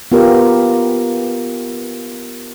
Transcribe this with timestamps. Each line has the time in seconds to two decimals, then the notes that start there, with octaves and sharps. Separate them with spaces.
0.12 B3 F4 G4 A#4